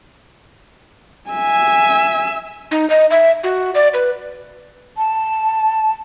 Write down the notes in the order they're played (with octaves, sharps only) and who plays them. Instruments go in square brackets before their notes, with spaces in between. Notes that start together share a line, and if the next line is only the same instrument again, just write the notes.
[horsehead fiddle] E5 G#5
[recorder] D#4
D#5
E5
F#4
D5
B4
[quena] A5